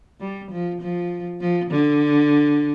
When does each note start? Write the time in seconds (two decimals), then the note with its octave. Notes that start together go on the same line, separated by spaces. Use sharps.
0.20 G3
0.51 F3
0.81 F3
1.41 F3
1.70 D3